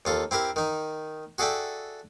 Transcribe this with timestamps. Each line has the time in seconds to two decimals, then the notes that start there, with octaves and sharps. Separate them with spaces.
0.05 D#2 F4 A4
0.31 C4 E4 G4 A#4
0.56 D#3 D#4
1.38 F#4 G#4 A4 D5 E5 G5